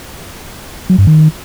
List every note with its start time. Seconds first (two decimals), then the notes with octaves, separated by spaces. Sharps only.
0.90 F#3
0.98 G2
1.07 D#3